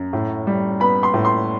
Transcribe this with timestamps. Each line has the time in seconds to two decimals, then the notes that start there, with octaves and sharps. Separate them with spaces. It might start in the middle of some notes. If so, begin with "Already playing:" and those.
Already playing: F#2
0.13 A2
0.47 G3
0.80 B3 B5
1.03 C6
1.14 A2
1.25 C6